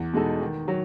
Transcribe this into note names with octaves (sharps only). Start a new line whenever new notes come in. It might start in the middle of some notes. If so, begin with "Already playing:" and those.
Already playing: E2
B2 G#3 D#4 A4
D#3
F#3